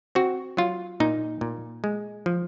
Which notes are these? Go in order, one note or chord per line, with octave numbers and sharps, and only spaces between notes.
C4 F#4
F#3 F4
A#2 D#4
A#2
G#3
F3